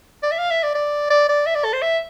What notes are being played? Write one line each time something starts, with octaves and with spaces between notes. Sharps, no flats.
D5
E5
F5
E5
D5
D5
D5
D5
E5
D5
A4
C5
E5